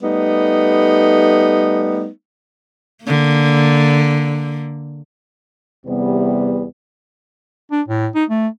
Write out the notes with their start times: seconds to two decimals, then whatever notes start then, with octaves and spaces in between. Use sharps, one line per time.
0.02 G3 A3 B3 D#4
3.03 D3 A#3
5.86 E2 C3 G3 B3
7.71 D4
7.88 A2
8.15 D#4
8.29 A3